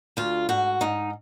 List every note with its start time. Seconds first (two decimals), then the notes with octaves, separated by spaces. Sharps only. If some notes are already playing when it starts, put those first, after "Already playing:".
0.17 D2 F4
0.49 G#2 F#4
0.81 G#2 D#4